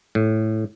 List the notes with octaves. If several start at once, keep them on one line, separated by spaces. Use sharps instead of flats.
A2